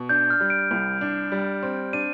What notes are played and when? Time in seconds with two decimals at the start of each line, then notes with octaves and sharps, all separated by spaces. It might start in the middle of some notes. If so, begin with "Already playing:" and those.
Already playing: B2
0.09 D4 G6
0.30 F6
0.40 G3
0.50 D7
0.71 C2
1.01 D4
1.32 G3
1.63 C4
1.93 D4 D#7